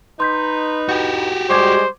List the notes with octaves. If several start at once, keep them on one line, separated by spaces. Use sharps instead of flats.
D#4 B4 C6 G6 B6
F#4 G4 G6
G3 G#3 C5 C#6 D6 G#6